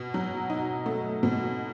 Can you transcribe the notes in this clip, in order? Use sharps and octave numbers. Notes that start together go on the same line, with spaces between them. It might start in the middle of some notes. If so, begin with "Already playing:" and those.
Already playing: B2
F#3
D#4
A3
B2